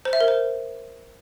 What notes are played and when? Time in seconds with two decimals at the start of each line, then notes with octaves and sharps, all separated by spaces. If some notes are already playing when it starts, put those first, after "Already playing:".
0.05 C5
0.13 E5
0.21 A#4
0.28 C5